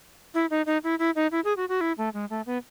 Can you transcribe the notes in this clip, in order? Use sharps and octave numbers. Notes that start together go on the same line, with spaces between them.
E4
D#4
D#4
E4
E4
D#4
E4
G#4
F#4
F#4
E4
A3
G#3
A3
B3